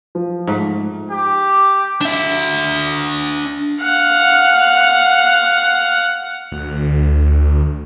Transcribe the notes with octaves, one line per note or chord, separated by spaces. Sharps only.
F3
G#2 A3
G4
D4 E5
F5 F#5
D2